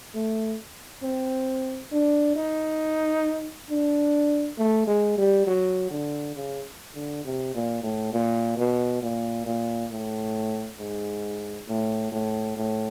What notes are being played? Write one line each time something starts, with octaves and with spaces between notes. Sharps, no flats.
A3
C4
D4
D#4
D4
A3
G#3
G3
F#3
D3
C#3
D3
C3
A#2
A2
A#2
B2
A#2
A#2
A2
G#2
A2
A2
A2